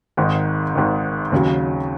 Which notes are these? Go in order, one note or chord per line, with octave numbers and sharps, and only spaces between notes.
G#1 G#2 D#3
G#1 G#2 D#3
D#2 C#3 F#3